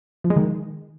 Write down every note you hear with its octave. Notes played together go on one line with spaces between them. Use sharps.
F3
G#3
D#3